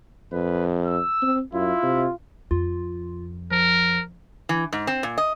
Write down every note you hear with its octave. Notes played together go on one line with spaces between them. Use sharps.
F2 B4
E6
C4
F#2 E4 F4
C3
F2 F4
F3 A#4
E3
G#2
C4
A#2
D#5